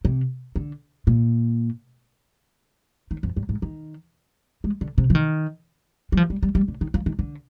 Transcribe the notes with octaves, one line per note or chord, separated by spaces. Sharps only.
C3
D3
A#2
D#3
F2
G2
G#2
D#3
G#3
D3
C3
F3
D#3
G3
F3
G3
G3
G3
D3
D#3
F3
D#3
D3